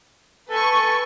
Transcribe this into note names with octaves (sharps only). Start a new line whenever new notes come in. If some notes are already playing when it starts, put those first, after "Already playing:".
A4 B4 G#5 C#6